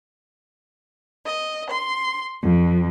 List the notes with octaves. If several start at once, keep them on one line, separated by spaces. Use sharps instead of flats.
D#5
C6
F2